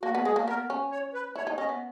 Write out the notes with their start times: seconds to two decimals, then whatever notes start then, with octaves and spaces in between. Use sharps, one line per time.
0.03 A#3 F#4
0.15 B3
0.25 G#3 G#4
0.36 A#3
0.48 B3 A#4
0.70 C#4
0.92 C#5
1.14 B4
1.36 E4 C#5
1.47 D#4
1.58 C#4 D#5
1.69 B3